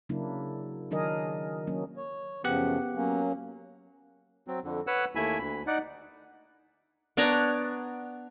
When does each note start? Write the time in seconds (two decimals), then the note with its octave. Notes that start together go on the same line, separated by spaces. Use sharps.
0.09 C#3 F#3 A#3 D4 E4
0.91 D#3 F#3 D4 G#4 A#4 D#5
1.67 F#3 A#3 C#4
1.97 C#5
2.44 F#2 C#3 F3 B3 G4 F#5
2.95 F#3 A#3 C#4
4.48 F#3 C4
4.64 F2 D3
4.87 B4 C#5 F#5 E6
5.15 D#2 A3 E4 E5 G#5 B5
5.39 D2 B5
5.67 D#4 D5 F#5
7.17 B3 D4 C#5 A#5